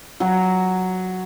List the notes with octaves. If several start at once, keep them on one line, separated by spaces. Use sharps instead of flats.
F#3